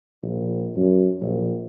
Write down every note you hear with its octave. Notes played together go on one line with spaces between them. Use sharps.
A#1
F#2
A#1